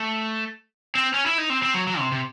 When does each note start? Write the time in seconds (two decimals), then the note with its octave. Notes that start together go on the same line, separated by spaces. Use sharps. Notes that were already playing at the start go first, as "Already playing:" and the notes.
Already playing: A3
0.95 C4
1.14 C#4
1.26 E4
1.38 D#4
1.50 C4
1.63 C4
1.74 F#3
1.87 F#3
1.99 C3
2.12 C3